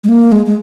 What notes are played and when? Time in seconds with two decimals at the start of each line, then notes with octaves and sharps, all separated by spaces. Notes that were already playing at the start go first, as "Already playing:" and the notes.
0.04 G#3
0.09 A#3
0.32 G#3
0.46 G#3